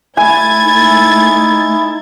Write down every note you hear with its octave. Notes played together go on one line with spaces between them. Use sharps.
A3 E4 G#5 G#6 A6
D#4